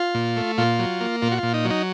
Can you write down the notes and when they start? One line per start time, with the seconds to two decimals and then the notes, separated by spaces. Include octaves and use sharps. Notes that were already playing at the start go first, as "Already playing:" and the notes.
Already playing: F4
0.15 A#2
0.37 A3
0.58 A#2 F4
0.79 F#3
1.01 A#3
1.22 A#2 F4
1.32 F#4
1.38 A#2 F4
1.54 D#4
1.65 F#3
1.70 D#4